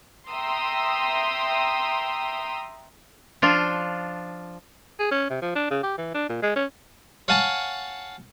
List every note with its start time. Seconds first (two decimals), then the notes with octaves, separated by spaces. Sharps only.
0.30 E5 G5 A#5 C6 D#6 E6
3.42 F3 D4 F4
4.99 G#4
5.11 C#4
5.30 C3
5.42 F3
5.55 D4
5.71 C#3
5.83 G4
5.98 E3
6.14 D4
6.29 A#2
6.42 G#3
6.56 C#4
7.28 C#5 F5 F#5 G#5 A5 C#6